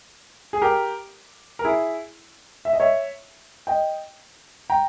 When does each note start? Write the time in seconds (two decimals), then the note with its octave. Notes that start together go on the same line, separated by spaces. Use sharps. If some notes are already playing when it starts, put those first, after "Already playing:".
0.53 G#4
0.62 G4 A#4
1.59 A#4
1.64 E4 G#4
2.65 E5
2.73 D#5
2.80 C#5 E5
3.67 D#5 G5
4.70 G5 A#5